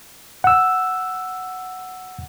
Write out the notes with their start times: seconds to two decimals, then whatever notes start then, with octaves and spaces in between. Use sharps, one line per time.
0.44 F#5 E6